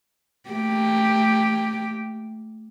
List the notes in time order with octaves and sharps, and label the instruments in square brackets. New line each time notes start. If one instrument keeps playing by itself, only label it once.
[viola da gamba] A3 A#3 G4